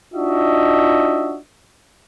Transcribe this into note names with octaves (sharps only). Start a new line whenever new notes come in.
D4 D#4 F4 F#4 D#5 E5